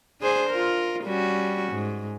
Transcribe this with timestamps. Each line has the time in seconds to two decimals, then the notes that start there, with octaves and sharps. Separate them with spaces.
0.20 D4 G#4 C5
0.50 F4 A#4
1.05 G3 C#4 F#4
1.73 G#2